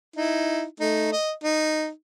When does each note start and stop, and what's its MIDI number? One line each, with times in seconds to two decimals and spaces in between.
0.16 0.64 63
0.16 0.64 64
0.80 1.12 57
0.80 1.12 63
1.13 1.32 75
1.44 1.89 63